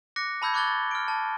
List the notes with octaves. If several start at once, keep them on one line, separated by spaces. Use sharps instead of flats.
D6 F#6 A#6 C#7
A5 B5 E6 G6 G#6
C#6 D6 F#6 G#6 A6 G7
A6
F6 D7
A5